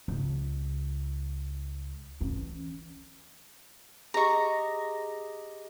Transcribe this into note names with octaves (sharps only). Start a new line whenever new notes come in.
C#2
E3 C#4
G4 G#4 D#5 A#5 C#6